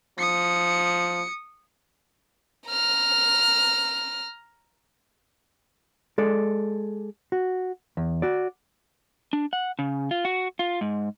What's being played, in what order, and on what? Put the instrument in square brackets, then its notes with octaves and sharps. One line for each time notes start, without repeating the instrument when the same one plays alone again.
[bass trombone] F3 [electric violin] D#6 C#7
[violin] A#5 F6
[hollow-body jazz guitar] G#3 A4 D5
F#4
E2
F#4 D5
[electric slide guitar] D4
F#5
C#3
F4
F#4
F4
G#2